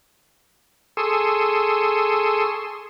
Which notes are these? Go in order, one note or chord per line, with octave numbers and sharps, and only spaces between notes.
G#4 A4 C6 C#6 D#6 E6